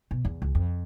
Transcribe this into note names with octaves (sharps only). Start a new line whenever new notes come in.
B2
E2
C#2
F2